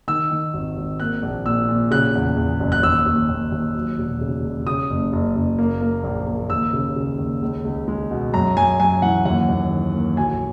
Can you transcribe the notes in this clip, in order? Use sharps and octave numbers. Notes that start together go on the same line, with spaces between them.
D#3 E6
D#3
G#1
G#1
A#3 F#6
A#1
A#2 E6
A#2
C#3 F#6
E2
E2
F#1
F#6
D#2 E6
D#2
D#2
D#2
F#3
E1
C#3
E1
C#3 D#6
F#1
F#1
F#1
A#3
A#3
A#1
A#3
D#2 E6
C#3
C#3
D#2
C#2
C#2
G#3
B2
F#2 A#5
F#2 G#5
F#2 G#5
E3 F#5
D#2 F#5
D#2
D#3
A#3
B1 G#5